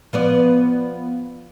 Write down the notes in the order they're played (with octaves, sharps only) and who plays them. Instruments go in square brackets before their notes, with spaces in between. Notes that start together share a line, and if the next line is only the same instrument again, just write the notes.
[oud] F3 B3 D5